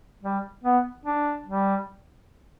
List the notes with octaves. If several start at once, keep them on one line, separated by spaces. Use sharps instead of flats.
G3
B3
D4
G3